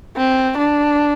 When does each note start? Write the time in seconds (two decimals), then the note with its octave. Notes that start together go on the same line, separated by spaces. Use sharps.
0.17 C4
0.58 D4